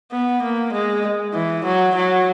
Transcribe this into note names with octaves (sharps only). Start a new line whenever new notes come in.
B3
A#3
G#3
E3
F#3
F#3